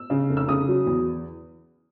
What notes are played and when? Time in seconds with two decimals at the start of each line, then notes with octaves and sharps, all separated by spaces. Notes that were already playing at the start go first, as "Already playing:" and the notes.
Already playing: E6
0.10 C#3
0.29 F1
0.37 E6
0.48 C#3 D#6
0.68 F#3
0.87 E2